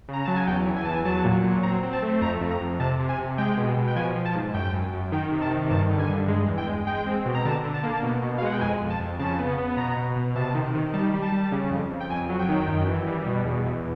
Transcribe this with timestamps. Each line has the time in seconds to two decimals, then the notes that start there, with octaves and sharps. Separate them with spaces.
0.08 C#3 A#5
0.25 F#3 A5
0.36 G#5
0.47 E2 G5
0.67 E3
0.76 G#5
0.85 E2 A5
0.94 G#5
1.05 F#3 A5
1.25 A#2
1.44 F#3
1.63 C4 A#5
1.83 C4
1.93 A5
2.02 A3
2.21 F2 A#5
2.41 F2
2.51 A#5
2.61 F2
2.80 C3 A5
2.99 C3
3.09 G#5
3.18 C3
3.38 G#3 G5
3.57 B2
3.77 B2
3.88 G5
3.96 F3 G#5
4.16 F3
4.25 A5
4.35 G#2
4.54 F#2 G5
4.73 F#2
4.93 F#2
5.12 D#3 G5
5.32 C3
5.42 A5
5.51 D#3
5.70 G2 A5
5.90 D3
5.99 G#5
6.09 G2
6.28 G#3
6.48 E2
6.58 G5
6.67 G#3
6.87 G#3 G5
7.06 C4
7.25 B2
7.35 A#5
7.45 D3 A5
7.64 D3
7.74 A5
7.83 A#3
8.03 B2
8.22 B2
8.38 F5
8.42 G#3 F#5
8.53 G5
8.61 F2 G#5
8.80 F2
8.90 A5
9.00 F2
9.19 C#3 A5
9.39 B3
9.58 B3
9.77 B2 A#5
9.97 B2
10.16 B2
10.35 C3 A5
10.55 D#3
10.74 D#3
10.94 G3 A5
11.13 G3
11.22 A5
11.32 G3
11.52 C#3
11.71 F2
11.90 F2
12.00 G5
12.10 F2 G#5
12.29 F#3
12.39 G5
12.49 D#3
12.68 F#2
12.87 E3
13.07 G3
13.26 B2
13.45 E2
13.65 E2